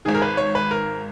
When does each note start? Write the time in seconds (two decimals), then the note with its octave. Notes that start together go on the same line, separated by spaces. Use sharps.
0.05 G#1 G#2 D#3 G#4
0.14 A#4
0.22 B4
0.37 C#5
0.55 B4
0.71 A#4